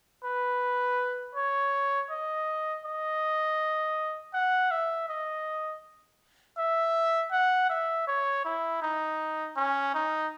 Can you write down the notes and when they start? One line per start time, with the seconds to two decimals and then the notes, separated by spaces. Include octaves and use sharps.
0.24 B4
1.35 C#5
2.10 D#5
2.85 D#5
4.34 F#5
4.71 E5
5.09 D#5
6.58 E5
7.32 F#5
7.70 E5
8.07 C#5
8.45 E4
8.82 D#4
9.57 C#4
9.94 D#4